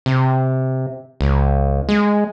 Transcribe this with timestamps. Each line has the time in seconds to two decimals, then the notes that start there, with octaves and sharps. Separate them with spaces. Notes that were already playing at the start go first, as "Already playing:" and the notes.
0.06 C3
1.21 C#2
1.89 G#3